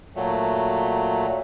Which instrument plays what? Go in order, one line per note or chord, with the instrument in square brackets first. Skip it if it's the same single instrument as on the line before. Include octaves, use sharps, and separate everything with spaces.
[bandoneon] A#2 F#3 A3